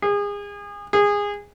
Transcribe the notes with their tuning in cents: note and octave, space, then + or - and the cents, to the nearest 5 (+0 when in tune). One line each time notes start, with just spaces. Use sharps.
G#4 -30
G#4 -20